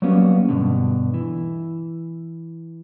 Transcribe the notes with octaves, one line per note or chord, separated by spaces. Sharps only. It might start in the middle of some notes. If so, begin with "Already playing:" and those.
F#3 G3 A#3 B3 C#4
G2 B2 D3
E3